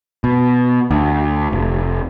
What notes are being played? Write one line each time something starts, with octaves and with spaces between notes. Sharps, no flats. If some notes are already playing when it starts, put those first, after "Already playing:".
B2
D2
F1